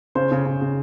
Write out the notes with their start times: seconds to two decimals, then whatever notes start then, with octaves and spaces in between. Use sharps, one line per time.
0.15 C#3 C5
0.32 C#3
0.45 C#3
0.61 C#3